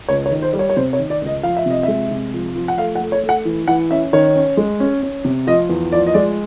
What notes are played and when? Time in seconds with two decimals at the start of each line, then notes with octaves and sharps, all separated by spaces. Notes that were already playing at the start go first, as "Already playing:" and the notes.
0.09 C#2 C#5
0.26 C#5
0.31 D#3
0.42 C5
0.53 G3
0.59 C#5
0.70 C#5
0.76 C3 C5
0.93 C#5
0.99 D#3
1.10 D5
1.21 C#2
1.26 D#5
1.43 F3 F5
1.57 E5
1.66 C3 D#5
1.83 G#3 E5
2.11 C3
2.33 F3
2.56 F3
2.68 F#5
2.77 A3 F5
2.95 F#5
3.01 A3
3.12 C#5
3.23 A3
3.29 F#5
3.45 E3
3.67 E3 F#5
3.91 C#4 E5
4.13 D#3 C#5
4.36 C#4
4.57 G#3
4.80 C#4
5.03 C#4
5.25 C3
5.47 F3 D#5
5.69 E2
5.92 F3 D5
6.07 D#5
6.14 G#3 D5